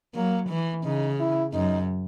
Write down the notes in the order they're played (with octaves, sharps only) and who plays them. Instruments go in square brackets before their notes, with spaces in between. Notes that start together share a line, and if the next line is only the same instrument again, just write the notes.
[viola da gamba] F#3 [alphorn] A#3
[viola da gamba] E3
[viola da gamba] C#3 [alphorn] D#4
[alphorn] E4
[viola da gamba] F#2 [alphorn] D#4